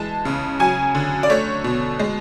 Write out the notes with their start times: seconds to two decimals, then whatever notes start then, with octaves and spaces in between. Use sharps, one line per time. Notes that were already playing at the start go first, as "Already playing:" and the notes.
Already playing: E3 G#3 A5
0.25 C#3
0.59 F#3 G#5
0.95 D3
1.23 D5
1.30 A3 C#5
1.64 B2
1.99 G#3